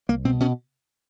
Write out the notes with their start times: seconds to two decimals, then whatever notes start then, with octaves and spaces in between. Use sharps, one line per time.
0.09 C2 A#3
0.25 B2 C4
0.40 B2 C#4